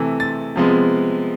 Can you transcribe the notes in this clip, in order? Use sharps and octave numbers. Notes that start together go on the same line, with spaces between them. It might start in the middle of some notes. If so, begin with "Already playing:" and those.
Already playing: C3 E3 A3
A6
C3 F3 G#3 B3